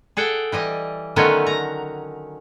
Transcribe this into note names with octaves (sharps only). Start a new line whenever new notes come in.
G#4 A4 F#5 G5
E3 G3 D#5
D3 D#3 F#3 A3 B3 C#4
A#5